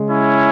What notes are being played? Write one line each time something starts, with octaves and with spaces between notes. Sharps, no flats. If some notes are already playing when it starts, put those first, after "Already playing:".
Already playing: C#3 G#3
C#4 E4